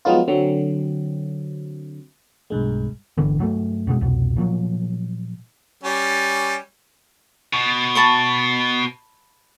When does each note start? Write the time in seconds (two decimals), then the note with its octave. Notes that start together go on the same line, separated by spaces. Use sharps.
0.05 F3 F#3 G#3 B3 D#4 F4
0.28 D3 F#3 C4
2.50 B1 G2 G#3
3.17 G1 D3 E3
3.39 G2 F#3 G3 A3
3.87 F#2 B2 G#3
4.01 C2 F2 B2
4.36 A#2 F3 F#3
5.83 G3 C#4
7.53 B2
7.95 A5 B5 C#6